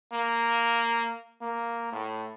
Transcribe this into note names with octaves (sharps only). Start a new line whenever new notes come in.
A#3
A#3
A2